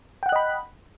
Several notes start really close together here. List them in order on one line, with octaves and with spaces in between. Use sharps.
G5 F#5 F#6 D#5 B5